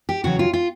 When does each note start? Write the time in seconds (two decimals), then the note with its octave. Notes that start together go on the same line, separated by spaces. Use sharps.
0.09 G4
0.24 E2 C#3 F#3 F#4
0.39 F4
0.53 F4